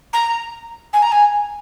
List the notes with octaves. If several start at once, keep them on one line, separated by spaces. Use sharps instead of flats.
A#5
G#5
A#5
G#5